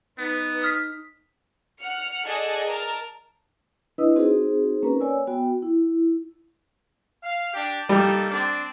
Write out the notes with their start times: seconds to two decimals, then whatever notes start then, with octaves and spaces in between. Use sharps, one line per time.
0.18 B3 D#4 B4
0.62 D#6 F6 B6
1.80 F#5 F6 C#7
2.27 G#4 A4 D5 D#5 F#5 A5
2.68 A#4 A5 F6
3.98 D4 E4 B4 D#5 D#6 E6
4.16 C4 D#4 F#4 G#4 C5
4.83 A#3 C#4 A#4 B4 A#5
5.00 C#5 D5 G#5 E6
5.27 B3 F#4 G5
5.63 E4
7.23 F5
7.54 D4 G4
7.89 G3 A#3 D#4 A4
8.30 C4 D4 D5